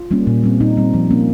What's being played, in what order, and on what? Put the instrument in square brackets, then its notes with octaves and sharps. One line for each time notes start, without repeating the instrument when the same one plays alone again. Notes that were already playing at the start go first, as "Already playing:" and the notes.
Already playing: [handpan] F4
G3 A#3 C#4
A#2
G3 C4
A#2 D#4
G3 C4
F3
A#3 C#4